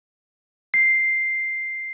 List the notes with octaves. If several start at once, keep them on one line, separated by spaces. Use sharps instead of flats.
C7